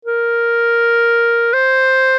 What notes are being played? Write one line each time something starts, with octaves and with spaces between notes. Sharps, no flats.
A#4
C5